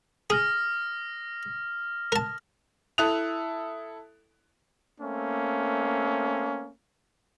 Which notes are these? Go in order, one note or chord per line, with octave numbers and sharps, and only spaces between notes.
G#4 D#6 F6 A#6
A#4 A5
E4 A4 D#6 F#6 F7
A3 A#3 C4 C#4